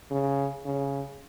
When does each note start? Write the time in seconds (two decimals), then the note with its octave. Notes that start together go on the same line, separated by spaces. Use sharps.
0.11 C#3
0.65 C#3